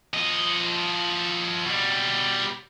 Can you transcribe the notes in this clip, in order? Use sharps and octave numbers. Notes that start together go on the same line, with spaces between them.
F3 D#5
B2 G3